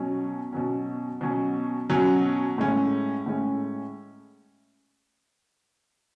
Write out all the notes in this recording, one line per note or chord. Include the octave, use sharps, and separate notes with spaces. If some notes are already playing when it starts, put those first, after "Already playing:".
Already playing: B2 F#3 C#4
B2 F#3 C#4
B2 F#3 C#4
B2 F#3 C#4
A2 G#3 C#4
A2 G#3 C#4